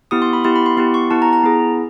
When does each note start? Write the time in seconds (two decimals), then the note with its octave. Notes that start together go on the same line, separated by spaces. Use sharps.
0.11 B3 E4 G4 D#6
0.22 C6
0.33 B5
0.44 B3 E4 G4 C6
0.56 B5
0.66 C6
0.77 B3 E4 G4 C6
0.94 C#6
1.10 B3 E4 G4 A5
1.22 A#5
1.33 A#5
1.43 B3 E4 G#4